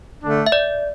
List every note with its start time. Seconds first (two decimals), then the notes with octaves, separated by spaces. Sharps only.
0.23 D3 A3 D4
0.46 E5
0.52 D5